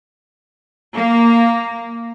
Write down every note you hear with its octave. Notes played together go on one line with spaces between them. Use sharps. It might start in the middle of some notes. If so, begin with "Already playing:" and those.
A#3